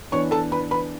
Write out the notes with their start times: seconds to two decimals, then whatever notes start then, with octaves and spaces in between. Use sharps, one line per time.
0.12 E3 B3 D4 C#5 C#6
0.31 A4 A5
0.52 B4 B5
0.71 B4 B5